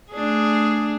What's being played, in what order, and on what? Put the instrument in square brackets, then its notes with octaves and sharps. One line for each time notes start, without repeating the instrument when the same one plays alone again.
[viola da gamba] A3 D4 G#4